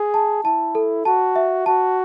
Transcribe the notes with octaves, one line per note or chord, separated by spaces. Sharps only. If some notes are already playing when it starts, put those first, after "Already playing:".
Already playing: G#4
A5
E4 A5
A4
F#4 A5
E5
F#4 A5